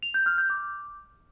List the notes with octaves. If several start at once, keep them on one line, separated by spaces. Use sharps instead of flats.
F7
G6
F6
G6
D6